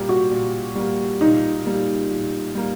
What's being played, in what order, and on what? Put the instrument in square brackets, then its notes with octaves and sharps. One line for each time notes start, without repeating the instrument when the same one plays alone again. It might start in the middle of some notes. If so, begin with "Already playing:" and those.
Already playing: [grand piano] A#2 G3 A#3 [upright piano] G4
[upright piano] F#4
[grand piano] A#2
G3 A#3
[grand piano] A#2 [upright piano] D#4
[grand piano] G3 A#3
A#2
G3 A#3